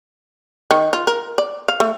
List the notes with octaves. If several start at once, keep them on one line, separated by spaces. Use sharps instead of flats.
D#3
F4
A#4
D5
F5
A3